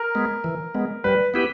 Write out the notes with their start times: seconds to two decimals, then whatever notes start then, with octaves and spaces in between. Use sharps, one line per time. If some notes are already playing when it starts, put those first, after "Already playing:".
Already playing: A#4
0.15 G#3 B3
0.44 E3
0.74 G#3 B3
1.04 G3 B4
1.34 B3 E4 G4 B4